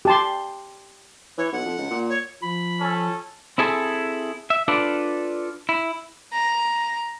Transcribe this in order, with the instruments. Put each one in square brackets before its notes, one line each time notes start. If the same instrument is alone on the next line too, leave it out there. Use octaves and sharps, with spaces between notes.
[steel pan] G4 A5 C6
[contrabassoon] E3 [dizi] C#5
[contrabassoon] B1 [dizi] F#5
[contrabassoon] F2
C#2
A#2
[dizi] C#5
[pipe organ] F3 [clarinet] B5
[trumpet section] C#4 A4
[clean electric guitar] C4 E4 G#4 A4
E5
D4 F4 A4 B4 D5
E4
[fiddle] A#5